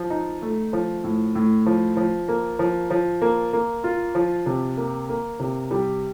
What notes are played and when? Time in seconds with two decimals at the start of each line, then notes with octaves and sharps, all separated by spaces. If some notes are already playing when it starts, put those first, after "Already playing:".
Already playing: F3
0.10 D#4
0.42 A3
0.73 F3
1.04 A2
1.35 A2
1.66 F3
1.97 F3
2.28 A#3
2.59 F3
2.91 F3
3.22 A#3
3.53 A#3
3.84 F4
4.15 F3
4.46 C3
4.77 A#3
5.09 A#3
5.40 C3
5.71 G3